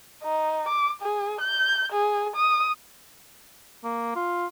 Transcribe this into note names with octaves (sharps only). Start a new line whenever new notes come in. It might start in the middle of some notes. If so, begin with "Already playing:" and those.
D#4
D6
G#4
G6
G#4
D#6
A#3
F4